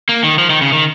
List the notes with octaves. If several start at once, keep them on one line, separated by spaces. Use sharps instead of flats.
A#3
D#3
F3
D#3
C#3
D#3